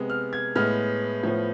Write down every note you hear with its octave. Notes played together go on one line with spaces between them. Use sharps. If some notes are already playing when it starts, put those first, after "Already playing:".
Already playing: C3 G#3 B3
F6
G#6
A2 G#3 B3 F6
A2 F3 B3